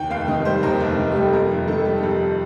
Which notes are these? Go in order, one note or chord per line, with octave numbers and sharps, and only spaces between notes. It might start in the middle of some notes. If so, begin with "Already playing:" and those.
Already playing: D#2 G5
F1 F5
D#3 D#5
G3 C5
D#2 A#4
F1
D#3
G3 G4
A4
F2 A#4
F1
D#3 A4
G3
G4
F2 A4